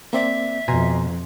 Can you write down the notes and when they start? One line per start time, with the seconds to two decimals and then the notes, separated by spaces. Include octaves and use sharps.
0.13 A#3 C4 D5 E5
0.68 F2 B2 G#5 A#5 C6